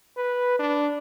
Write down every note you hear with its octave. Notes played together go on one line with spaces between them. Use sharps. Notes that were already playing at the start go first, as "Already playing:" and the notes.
B4
D4